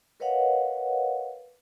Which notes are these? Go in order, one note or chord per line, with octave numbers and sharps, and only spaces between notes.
A#4 B4 C#5 D#5 F5 F#5